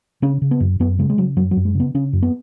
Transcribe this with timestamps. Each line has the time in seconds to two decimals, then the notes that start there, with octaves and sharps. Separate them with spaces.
0.22 C#3 C#4
0.42 C#3
0.51 B3
0.60 F#2
0.80 F#2 B3
0.99 C#3 G#3
1.10 G#3
1.17 C#3 F#3
1.36 F#2 F#3
1.51 F#3
1.57 F#2
1.65 G#3
1.75 C#3
1.80 B3
1.94 C#3 C#4
2.13 F#2
2.23 B3